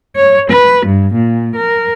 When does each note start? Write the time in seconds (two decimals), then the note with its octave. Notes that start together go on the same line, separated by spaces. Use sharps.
0.16 C#5
0.50 B4
0.85 G2
1.14 A#2
1.55 A#4